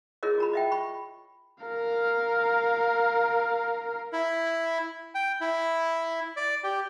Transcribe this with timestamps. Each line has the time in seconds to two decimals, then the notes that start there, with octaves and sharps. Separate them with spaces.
0.23 E4 G#4 A#4 C#5 D#5
0.38 F4 A#5 B5
0.53 D#5 E5 G5
0.72 B5 C#6
1.64 A#4 F5
4.13 E4
5.15 G5
5.41 E4
6.37 D5
6.64 G4